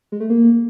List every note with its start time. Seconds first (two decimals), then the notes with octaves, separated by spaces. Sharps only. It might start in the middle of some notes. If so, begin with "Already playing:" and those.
0.12 G#3
0.20 A3
0.30 A#3